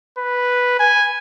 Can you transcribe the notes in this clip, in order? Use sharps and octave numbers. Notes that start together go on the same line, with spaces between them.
B4
G#5